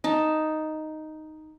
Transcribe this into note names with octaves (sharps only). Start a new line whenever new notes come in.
D#4 A5